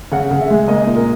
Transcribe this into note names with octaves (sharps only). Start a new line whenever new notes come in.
C#3 F#5
C#3
E5
G#3
A#3 D#5
A#2
A#4